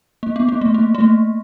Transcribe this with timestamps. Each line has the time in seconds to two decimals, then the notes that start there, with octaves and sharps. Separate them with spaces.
0.23 A#3
0.36 B3
0.49 A#3
0.61 A3
0.74 A#3
0.95 A3
1.00 A#3